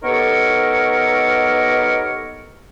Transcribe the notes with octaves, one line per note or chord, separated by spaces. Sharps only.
B3 D#4 G4 A4 A#4 C#5